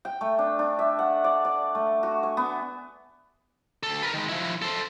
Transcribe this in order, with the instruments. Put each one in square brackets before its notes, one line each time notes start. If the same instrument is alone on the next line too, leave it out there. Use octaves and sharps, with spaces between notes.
[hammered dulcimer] G5
A3
D4
D4
E5
F#5
D5
D5
A3
F#4
G#5
B3
[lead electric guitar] D2 A4
A#4 B4
D#3 G#3
F3 E4
A4 C5